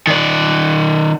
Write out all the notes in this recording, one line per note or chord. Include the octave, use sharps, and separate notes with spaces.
D#3 D5